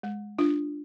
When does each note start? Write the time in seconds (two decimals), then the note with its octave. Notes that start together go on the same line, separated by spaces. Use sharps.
0.03 G#3
0.39 D4 F4